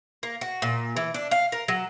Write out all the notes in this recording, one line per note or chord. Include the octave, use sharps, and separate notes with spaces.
A#3
F#4
A#2
E3
D4
F5
A#4
F#3